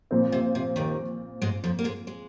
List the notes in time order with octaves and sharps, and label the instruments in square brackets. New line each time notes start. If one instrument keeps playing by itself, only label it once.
[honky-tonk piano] A#2 F3 C4
[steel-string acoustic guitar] C3
C3
D#2 D#3
G#2 G#3
F2 F3
A#3
G#2 G#3
G#3